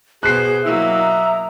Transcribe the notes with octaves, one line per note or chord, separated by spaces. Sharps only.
B2 G#4 C5 F#6 C7
F#3 A#3 E4 D#5 E5
A#5